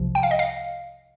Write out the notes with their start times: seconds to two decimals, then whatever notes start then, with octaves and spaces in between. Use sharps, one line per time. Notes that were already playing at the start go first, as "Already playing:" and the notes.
Already playing: C2 C3 F3
0.15 G5
0.23 F5
0.31 D#5
0.39 F5